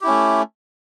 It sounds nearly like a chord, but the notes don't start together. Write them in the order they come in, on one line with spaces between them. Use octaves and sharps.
G4 E4 C#4 A3